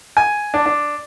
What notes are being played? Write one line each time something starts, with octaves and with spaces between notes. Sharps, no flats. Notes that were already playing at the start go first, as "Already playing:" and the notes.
G#5
D4
D4